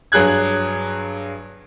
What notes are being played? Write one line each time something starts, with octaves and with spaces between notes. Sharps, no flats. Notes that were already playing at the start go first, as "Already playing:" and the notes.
G2 F#3 G#4 F#6 G#6